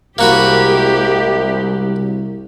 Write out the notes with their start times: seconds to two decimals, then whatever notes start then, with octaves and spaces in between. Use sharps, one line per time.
0.18 C2 G#3 A#3 F#4 G4 B5